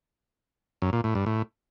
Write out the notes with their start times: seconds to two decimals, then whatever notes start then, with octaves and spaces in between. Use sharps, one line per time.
0.82 F#2
0.93 A#2
1.04 A2
1.15 G2
1.26 A2